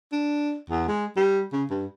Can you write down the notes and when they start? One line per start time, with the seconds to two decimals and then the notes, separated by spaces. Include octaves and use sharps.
0.12 D4
0.70 E2
0.88 G#3
1.16 G3
1.52 C#3
1.70 G2